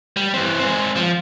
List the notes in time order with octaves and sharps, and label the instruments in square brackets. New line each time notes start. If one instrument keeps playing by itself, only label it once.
[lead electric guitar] G3
E3 C4
G#3 C4
F3